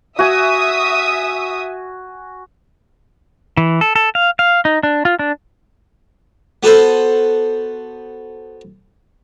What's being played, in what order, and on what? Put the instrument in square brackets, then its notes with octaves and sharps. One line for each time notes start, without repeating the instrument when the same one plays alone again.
[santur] F#4 G#5 [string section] E5 D#6
[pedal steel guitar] E3
A4
A4
F5
F5
D#4
D4
F4
D4
[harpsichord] B3 F#4 A4 B4 C5